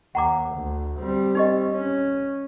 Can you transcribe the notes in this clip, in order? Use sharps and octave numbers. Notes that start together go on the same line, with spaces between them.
D#2 F#5 A#5 D6
D2
G3 C4
D#4 G4 D#5
C#4